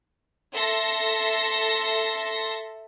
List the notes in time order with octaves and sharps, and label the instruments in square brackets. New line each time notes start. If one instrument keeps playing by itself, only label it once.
[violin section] A4 E5 C6 A#6